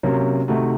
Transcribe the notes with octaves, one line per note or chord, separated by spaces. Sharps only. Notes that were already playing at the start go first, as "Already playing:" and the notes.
C3 F#3 A#3 C#4
C3 D#3 A3 D#4 F#4